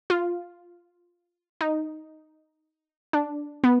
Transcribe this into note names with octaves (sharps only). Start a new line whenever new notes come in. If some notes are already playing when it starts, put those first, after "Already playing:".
F4
D#4
D4
B3